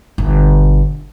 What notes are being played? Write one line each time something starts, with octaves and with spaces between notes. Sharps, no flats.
G1 B2